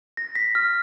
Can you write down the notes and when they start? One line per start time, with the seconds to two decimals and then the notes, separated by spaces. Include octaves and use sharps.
0.17 A#6
0.35 B6
0.55 F6